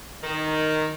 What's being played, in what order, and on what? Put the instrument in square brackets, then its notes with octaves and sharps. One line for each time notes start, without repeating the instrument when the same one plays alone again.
[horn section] D#3